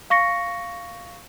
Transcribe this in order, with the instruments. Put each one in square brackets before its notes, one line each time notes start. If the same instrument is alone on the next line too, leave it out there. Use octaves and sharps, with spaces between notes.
[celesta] F5 C#6 A#6 C#7